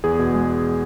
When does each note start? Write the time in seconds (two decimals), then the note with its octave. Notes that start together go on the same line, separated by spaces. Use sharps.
0.04 E2 G#4
0.19 B2
0.34 G#3